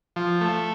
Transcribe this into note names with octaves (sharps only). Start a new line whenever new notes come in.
F3
A3